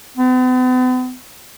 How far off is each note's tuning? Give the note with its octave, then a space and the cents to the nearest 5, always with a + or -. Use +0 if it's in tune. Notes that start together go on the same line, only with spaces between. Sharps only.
B3 +45